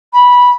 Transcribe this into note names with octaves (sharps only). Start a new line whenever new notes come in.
B5